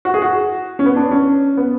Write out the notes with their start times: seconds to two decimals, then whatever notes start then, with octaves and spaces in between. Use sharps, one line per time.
0.05 F#4
0.14 G#4
0.22 F#4
0.79 C#4
0.86 B3
0.96 D4
1.11 C#4
1.57 B3